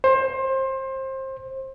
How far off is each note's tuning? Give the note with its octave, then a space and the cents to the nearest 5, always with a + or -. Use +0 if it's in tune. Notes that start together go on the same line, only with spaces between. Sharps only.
C5 +25